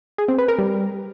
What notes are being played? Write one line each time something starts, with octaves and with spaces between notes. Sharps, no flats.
G#4
C4
B4
A#4
G3